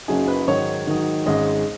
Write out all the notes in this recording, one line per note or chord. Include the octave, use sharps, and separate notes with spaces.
F#1 F#2 F#3 D#4 G#4
B4
G#2 D#3 F#3 D#4 C#5
G#2 D#3 F#3 D#4
G#1 G#2 G#3 C#4 D#5